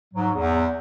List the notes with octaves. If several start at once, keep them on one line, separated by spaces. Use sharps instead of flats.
G#2 F#3
E2